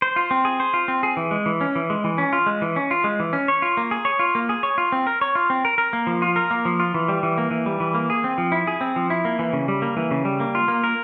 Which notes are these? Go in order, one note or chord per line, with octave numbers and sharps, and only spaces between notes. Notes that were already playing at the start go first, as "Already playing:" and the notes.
C5
F4
C4
G#4
C5
F4
C4
G#4
E3
G#3
E3
C#4
E3
G#3
E3
C#4
F4
G#3
E3
C#4
F4
G#3
E3
C#4
C#5
F4
A#3
G#4
C#5
F4
A#3
G#4
C#5
F4
C4
A#4
C#5
F4
C4
A#4
A#4
A#3
F3
F4
A#4
A#3
F3
F4
E3
G3
E3
A#3
E3
G3
E3
A#3
G#4
C4
F3
E4
G#4
C4
F3
E4
A#3
E3
C#3
G3
A#3
E3
C#3
G3
A#3
F4
A#3
A#4